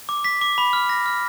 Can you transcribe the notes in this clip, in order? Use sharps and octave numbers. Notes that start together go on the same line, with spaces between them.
D6
B6
D6
B5
F6
A#6
F6